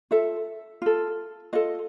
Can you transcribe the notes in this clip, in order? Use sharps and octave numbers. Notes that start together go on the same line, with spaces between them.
F4 A4 E5
F4 A4
F4 A4 D#5